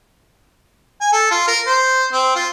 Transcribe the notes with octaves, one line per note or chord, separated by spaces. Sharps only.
G#5
A4
F4
A#4
C5
C4
F4